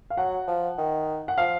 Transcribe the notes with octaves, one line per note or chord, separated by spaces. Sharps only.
F5
F#3 F#5
F3
D#3
F#5
F3 F5